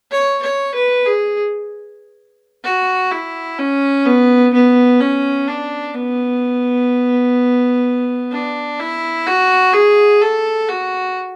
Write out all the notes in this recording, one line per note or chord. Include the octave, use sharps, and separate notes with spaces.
C#5
C#5
B4
G#4
F#4
E4
C#4
B3
B3
C#4
D4
B3
D4
E4
F#4
G#4
A4
F#4